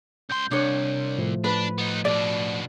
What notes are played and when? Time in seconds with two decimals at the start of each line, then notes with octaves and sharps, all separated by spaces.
0.30 C#2 C6 G6
0.51 C2 D4 C#5
1.18 A2 F3 A3
1.44 D4 B4
1.78 B3 D#4
2.05 B2 D4 D5